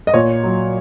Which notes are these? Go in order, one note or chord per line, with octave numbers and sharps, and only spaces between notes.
D#5
A#2 C#5
F#3